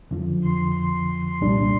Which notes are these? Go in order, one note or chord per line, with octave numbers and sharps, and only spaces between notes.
F2 D3 F3
C6
C6
C2 A#2 G3 D4